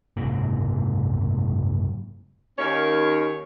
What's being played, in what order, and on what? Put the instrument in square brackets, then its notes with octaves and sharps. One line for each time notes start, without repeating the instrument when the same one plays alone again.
[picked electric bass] F#1 G#2 C3 A#3
[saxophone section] D#2 D#3 A#3 C#4 C#5